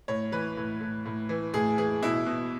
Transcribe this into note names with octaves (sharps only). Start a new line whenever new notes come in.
A2 C#5
E3 B4
A2
A2
A2
E3
A2 G#4
E3 G#4
B2 E4
B2